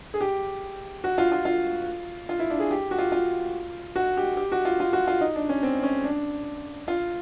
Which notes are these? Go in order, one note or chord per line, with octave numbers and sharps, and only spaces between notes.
G#4
G4
F#4
F4
F4
F4
F4
E4
D4
G#4
G4
F#4
F4
F4
F#4
G4
G4
F#4
F4
F4
F#4
F4
D#4
D4
C#4
C4
C#4
D4
F4